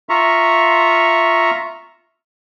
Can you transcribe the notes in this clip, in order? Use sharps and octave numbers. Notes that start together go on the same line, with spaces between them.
F4 E5 A#5 C#6